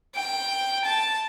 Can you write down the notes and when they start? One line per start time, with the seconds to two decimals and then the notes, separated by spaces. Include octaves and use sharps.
0.15 G5
0.85 A5